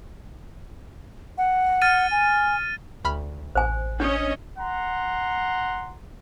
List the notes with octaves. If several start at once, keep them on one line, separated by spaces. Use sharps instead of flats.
F#5
F6 A6 D#7
G#5
D2 B5 F6
A1 C5 G#5
C#4 D4 C#5 D#5
F#5 A#5 C6